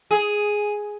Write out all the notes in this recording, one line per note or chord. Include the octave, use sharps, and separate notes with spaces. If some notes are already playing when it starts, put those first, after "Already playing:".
G#4